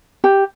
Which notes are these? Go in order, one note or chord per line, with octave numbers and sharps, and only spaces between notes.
G4